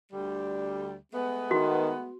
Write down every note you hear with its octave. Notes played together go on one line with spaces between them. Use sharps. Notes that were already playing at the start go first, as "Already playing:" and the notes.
D2 D3 G3
G#3 A3 B3
D#3 F#4